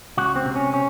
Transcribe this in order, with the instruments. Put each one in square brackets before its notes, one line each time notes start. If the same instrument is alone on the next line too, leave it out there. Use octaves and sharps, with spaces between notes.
[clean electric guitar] C#2 F#4
C4
C3
C#4
C#4